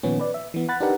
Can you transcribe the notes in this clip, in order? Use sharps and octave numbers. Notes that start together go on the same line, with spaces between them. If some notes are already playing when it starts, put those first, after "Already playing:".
A#2 D#3 F3 B3 C#4
B4 D5
E5
E3 B3
F#5 B5 F#6 A6
D4 D#4 G4 A#4 B4 F#5